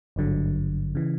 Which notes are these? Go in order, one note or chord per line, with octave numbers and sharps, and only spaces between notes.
G#1 G2 D3 F#3
C#3 E3